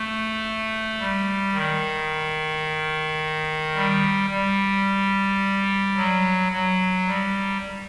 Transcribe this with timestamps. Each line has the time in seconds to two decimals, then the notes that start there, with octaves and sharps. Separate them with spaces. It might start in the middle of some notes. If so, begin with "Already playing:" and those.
Already playing: A3
0.99 G3
1.54 D#3
3.75 G3
4.30 G3
5.96 F#3
6.52 F#3
7.07 G3